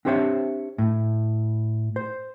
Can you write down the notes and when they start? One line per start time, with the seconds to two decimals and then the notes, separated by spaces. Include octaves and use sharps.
0.05 C4 D4 G4 C5 C#5 E5
0.78 A2
1.96 C5